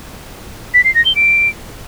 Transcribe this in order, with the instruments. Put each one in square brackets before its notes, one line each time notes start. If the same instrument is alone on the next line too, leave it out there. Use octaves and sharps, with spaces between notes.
[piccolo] B6
C7
A#6
G7
D7